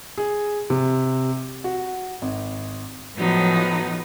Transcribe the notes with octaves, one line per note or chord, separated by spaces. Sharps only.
G#4
C3
F#4
G#1
A2 F3 F#3 B3 D#4